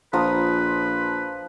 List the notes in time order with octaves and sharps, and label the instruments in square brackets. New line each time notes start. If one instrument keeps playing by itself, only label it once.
[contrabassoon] A#1 [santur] F3 A#5 D#6 [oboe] B4